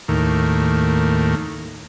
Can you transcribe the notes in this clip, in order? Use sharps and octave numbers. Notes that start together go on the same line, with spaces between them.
D#2 A2 A#3